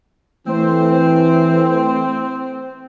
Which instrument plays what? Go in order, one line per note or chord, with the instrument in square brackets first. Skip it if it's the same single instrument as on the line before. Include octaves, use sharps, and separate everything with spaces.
[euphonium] E3 [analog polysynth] A3 C5 [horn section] C4